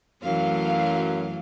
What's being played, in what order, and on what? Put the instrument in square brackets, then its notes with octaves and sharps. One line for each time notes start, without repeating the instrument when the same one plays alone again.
[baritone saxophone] F#2 [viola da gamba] E3 F#3 A3 [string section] F5